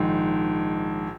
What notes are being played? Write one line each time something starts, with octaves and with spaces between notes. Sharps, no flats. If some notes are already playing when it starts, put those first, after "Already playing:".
Already playing: A#1 G#2 D#3